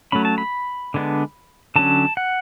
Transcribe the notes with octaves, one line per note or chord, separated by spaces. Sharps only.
F#3 A3 C#4 B5
A5
B5
D3 G#3 B3 D4
D3 F#3 C#4 A5
F#5